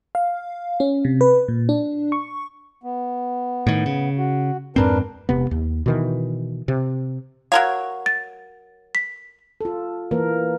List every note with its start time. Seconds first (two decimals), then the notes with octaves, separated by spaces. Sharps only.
0.15 F5
0.80 C#4
1.05 C3
1.21 B4
1.48 A#2
1.69 D4
2.12 C#6
2.83 B3
3.67 A2 D#3
3.86 C#3
4.18 F#4
4.76 F2 G#2 C4 D4 A#4 B4
5.29 E1 C3 B3
5.51 D#2
5.86 B2 D#3 E3
6.68 C3
7.52 F#3 A#4 C#5 F5
8.06 A6
8.95 B6
9.61 F4 A4
10.11 E3 A#3 A#4